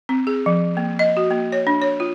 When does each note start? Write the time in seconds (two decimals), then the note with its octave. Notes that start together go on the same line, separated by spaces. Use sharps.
0.09 C4
0.27 G#4
0.46 F3
0.77 A#3
0.99 D#5
1.17 F#4
1.31 A#3
1.52 C#5
1.67 D4
1.82 C#5
2.00 F4